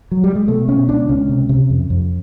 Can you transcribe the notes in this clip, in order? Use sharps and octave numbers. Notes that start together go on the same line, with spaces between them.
F#3
G3
G#3
B2 A3
B2 C#4
C#2 D4
C#2 C#4
C3
C3
F2
F2